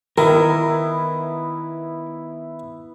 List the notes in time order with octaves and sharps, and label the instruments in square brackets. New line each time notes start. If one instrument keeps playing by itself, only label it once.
[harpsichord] D#3 [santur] B3 E4 [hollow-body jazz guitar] A#4